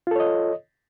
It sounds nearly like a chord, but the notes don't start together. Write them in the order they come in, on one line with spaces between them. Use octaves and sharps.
F4 A4 C#5 D#5